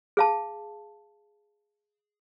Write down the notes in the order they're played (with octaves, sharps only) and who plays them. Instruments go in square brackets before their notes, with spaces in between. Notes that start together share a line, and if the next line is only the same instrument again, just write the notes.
[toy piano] G#4 F5 A5